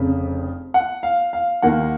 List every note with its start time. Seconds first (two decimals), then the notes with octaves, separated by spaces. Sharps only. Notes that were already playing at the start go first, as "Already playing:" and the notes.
Already playing: F1 F2 C#3
0.74 F#5
1.03 F5
1.33 F5
1.62 D#2 D#3 A#3 F#5